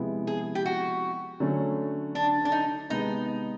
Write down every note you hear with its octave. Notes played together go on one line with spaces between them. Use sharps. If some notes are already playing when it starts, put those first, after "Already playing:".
Already playing: C3 F3 G#3 B3 E4
G#4
G4
F#4
D3 F#3 A3 C#4
D4
D4
D#4
C3 D#3 G#3 B3 D#4